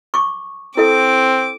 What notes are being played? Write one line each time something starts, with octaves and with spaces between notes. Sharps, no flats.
C#6 D6
C4 E4 A4 E5 D6